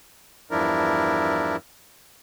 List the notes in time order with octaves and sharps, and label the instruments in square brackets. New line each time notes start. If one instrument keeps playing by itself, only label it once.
[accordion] E2 G2 F3 D4 E4 A#4